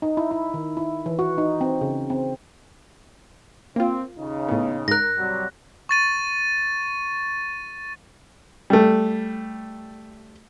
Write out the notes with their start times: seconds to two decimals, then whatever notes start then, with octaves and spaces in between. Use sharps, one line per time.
0.02 D#4
0.17 E4
0.31 E4
0.54 D#3
0.77 E4
1.06 E3
1.19 F#4
1.38 D#4
1.61 C4
1.81 C#3
2.10 C4
3.76 A#3 C4 F4
4.17 D#2 C#3 D#4
4.49 A2 B3
4.88 G#2 A#4 F#6 A#6
5.18 C3 F#3 G3
5.89 C#6 A6 D#7
8.70 G3 A3